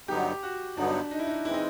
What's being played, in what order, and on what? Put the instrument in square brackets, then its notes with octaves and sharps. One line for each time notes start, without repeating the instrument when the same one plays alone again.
[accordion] G2 D3 F#3 B3 D#4 [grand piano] G4
[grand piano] F#4
[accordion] G2 D3 F#3 B3 D#4 [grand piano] D4
[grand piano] D#4
E4
D#4
[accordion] E3 G#3 C4 [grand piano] E4
[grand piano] D#4